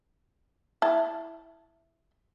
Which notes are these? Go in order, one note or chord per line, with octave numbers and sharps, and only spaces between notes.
E4 A5